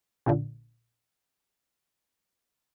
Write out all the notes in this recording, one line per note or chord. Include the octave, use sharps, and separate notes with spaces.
A#1 A#2 D3